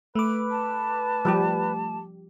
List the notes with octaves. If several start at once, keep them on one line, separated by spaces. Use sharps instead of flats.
A3 B4 D6
A5
F3 G3 G4